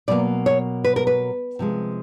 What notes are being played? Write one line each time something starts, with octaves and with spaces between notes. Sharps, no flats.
B2 F#3 A#3 D5
C#5
B4
A#4
B4
C3 F3 G#3